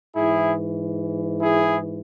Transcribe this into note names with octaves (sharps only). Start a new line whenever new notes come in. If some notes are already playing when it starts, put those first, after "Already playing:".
G#2 E3 E4 G#4
E4 G#4